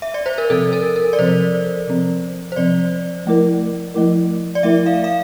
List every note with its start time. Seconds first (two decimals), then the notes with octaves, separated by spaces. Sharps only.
0.02 E5
0.14 D5
0.26 C5
0.38 A#4
0.50 C3 F3 C4 A4
0.73 A#4
0.96 A#4
1.13 D5
1.19 C3 F3 C4 C5
1.87 C3 F3 C4
2.52 C5
2.56 C3 F3 C4 D5
3.26 F3 A3 E4 A#4
3.94 F3 A3 E4 A#4
4.55 D5
4.63 F3 A3 E4 A#4 E5
4.86 F5
5.04 F5